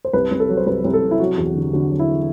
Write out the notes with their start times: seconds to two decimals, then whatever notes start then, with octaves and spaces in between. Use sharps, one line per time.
0.05 C5
0.13 C2 B4
0.31 C2
0.40 A4
0.49 F#3
0.57 C5
0.67 C2 B4
0.84 C2
0.93 A4
1.02 C3
1.11 E4
1.20 F#3 F#4
1.37 E2
1.55 D3
1.73 D3 F#4
1.91 F#3
2.00 E4